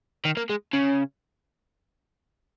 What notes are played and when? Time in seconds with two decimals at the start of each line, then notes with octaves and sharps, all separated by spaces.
0.25 D#3
0.37 A#3
0.49 G#3
0.73 C#3